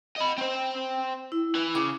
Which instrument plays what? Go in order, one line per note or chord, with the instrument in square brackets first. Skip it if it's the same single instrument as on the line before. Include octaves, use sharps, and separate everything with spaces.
[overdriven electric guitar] D#5 B5
C4 C5
[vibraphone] E4
[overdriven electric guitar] E3
[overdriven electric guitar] C#3 [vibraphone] D6